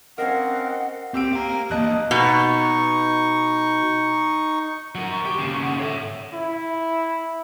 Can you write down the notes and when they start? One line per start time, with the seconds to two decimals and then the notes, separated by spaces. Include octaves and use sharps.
0.18 C4 C#4 A#4 D#5 F5 F#5
1.14 C4 G4 E6 D7
1.33 F5 A#5
1.71 E2 A#3 D#5 A5 F#6
2.11 B2 D#4 C#6
4.95 F#3 A#4 F#5
5.10 C#6
5.25 G4
5.39 D#2 C#3
5.62 F#5
5.79 A4 C#5 E5
6.34 E4